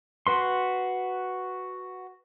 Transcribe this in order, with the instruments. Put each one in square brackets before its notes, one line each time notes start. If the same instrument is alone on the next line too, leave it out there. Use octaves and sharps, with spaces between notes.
[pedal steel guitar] F#4 B4 C6